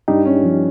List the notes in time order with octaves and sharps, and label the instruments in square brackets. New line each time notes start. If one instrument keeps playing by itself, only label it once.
[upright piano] G2 [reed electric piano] D#4 G4
[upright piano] C#4
F3